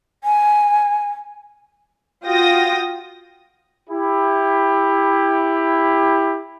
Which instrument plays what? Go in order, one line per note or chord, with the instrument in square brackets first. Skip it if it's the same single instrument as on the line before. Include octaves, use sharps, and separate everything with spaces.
[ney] G#5
[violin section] F4 F#4 G5 D#6 A#6
[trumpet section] E4 G4